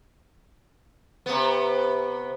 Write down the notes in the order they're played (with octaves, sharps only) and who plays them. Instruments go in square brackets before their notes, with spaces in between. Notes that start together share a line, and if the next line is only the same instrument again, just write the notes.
[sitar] C3 B3